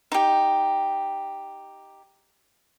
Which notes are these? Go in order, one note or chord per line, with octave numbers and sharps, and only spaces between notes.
D#4 G4